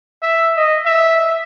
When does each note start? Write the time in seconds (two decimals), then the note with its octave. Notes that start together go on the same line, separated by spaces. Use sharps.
0.23 E5
0.57 D#5
0.86 E5